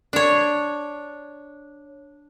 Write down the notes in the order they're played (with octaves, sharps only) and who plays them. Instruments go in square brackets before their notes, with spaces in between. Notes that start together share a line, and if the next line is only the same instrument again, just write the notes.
[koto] D4 C#5